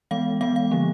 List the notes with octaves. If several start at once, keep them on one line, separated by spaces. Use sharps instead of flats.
E3 G#3 B3 F5
E3 G#3 B3 F5
F5
D3 F3 A#3